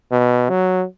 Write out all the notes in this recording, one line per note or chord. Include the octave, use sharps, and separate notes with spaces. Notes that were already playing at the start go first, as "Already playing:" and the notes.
B2
F#3